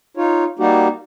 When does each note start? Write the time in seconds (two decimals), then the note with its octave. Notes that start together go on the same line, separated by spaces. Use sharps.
0.17 D#4 F4 C#5
0.59 G3 A#3 D#4 F#4 G4